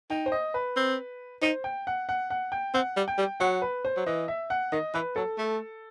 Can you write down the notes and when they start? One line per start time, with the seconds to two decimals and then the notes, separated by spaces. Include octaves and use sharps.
0.10 D#4 G5
0.26 C5
0.32 D#5
0.54 B4
0.76 C4
1.42 D#4 C5
1.64 G5
1.87 F#5
2.09 F#5
2.30 F#5
2.52 G5
2.74 C4 F#5
2.97 G3
3.08 G5
3.18 G3
3.40 F#3 F#5
3.62 B4
3.85 C5
3.97 F#3
4.06 E3 D#5
4.28 E5
4.50 F#5
4.72 D#3 D#5
4.94 E3 B4
5.16 F#3 A4
5.38 A3